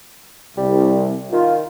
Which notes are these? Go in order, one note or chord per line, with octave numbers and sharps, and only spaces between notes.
C2 G3
D#3 F4